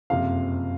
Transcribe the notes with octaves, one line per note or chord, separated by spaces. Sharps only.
F#1 F2 C3 F5